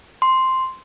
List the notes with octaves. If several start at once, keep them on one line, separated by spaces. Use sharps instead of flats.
C6